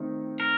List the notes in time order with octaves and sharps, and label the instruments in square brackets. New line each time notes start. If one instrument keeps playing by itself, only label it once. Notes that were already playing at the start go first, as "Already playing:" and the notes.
Already playing: [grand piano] D#3 A3 C4 D#4
[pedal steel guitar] A#4